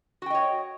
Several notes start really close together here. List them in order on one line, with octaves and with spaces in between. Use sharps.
F#4 G5 D#5 C#5